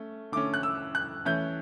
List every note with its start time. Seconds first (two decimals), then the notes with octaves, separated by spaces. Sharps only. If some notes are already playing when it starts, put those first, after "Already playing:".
Already playing: A3 C#4
0.32 D3 A3 C#4 D6
0.54 F#6
0.63 E6
0.95 F#6
1.25 E3 A3 C#4 G6